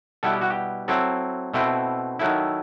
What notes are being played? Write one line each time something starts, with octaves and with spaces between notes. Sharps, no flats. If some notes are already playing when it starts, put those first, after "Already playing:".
B2 G3 B3 E4 A4
G4
F#4
G4
F#3 C4 E4 A4
B2 A3 C4 E4
D#3 F#3 A3 E4